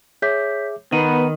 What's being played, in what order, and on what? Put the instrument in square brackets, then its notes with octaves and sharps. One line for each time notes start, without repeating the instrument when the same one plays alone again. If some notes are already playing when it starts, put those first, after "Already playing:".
[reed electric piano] G#4 E5 D6 [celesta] C#5 G6 B6
[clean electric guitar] D#3 [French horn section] B3 [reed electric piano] D#4 F#5 A#5 [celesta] D#7